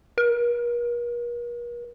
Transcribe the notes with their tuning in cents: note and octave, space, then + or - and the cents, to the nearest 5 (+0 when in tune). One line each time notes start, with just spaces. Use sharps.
A#4 +45